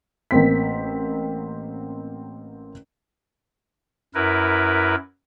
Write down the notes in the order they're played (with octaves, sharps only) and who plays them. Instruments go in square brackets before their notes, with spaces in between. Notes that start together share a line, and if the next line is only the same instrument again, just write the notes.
[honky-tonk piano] A1 A#3 C4 B6
[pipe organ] F#2 E4 A#4 B4